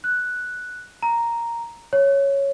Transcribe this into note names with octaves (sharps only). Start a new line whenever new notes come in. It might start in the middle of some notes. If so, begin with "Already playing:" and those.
F#6
A#5
C#5